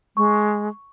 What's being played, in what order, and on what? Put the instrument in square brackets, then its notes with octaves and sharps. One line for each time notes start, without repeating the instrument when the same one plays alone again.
[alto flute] G#3 [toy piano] C#6